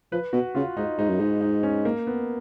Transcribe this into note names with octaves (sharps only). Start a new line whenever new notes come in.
F3 B4
B2 F#4
C#3 F4
G#2 D#4
G#2 D#4
F#2
G#2 D#4
D#4
C#4
A#3
B3